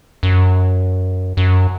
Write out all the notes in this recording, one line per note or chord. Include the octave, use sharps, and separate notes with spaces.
F#2
F#2